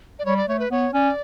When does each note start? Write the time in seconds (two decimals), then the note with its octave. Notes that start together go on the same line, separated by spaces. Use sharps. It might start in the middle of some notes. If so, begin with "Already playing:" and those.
0.19 D5
0.25 G3 C#5
0.37 D5
0.48 A3 C#5
0.59 B4
0.71 B3 C#5
0.93 C#4 D5